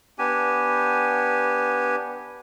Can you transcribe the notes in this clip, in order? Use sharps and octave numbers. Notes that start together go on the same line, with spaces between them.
B3 D4 G4 G#5